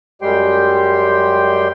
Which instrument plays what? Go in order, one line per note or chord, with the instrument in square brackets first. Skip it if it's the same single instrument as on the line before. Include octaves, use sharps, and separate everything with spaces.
[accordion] F#2 G3 G#3 G4 G5 C6